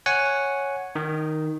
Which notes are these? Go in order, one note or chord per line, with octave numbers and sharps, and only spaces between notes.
C#5 F#5 G#5
D#3